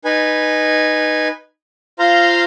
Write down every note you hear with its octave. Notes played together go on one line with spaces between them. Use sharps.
D#4 B4 G#5
F4 C5 F5 A#5